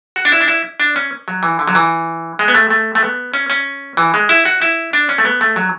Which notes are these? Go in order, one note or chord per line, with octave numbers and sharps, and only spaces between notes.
F#4
D4
E4
D4
E4
D4
C#4
F#3
E3
D3
F#3
E3
G#3
B3
A3
A3
A3
B3
C#4
C#4
E3
G#3
E4
F#4
E4
D4
C#4
A3
B3
A3
F#3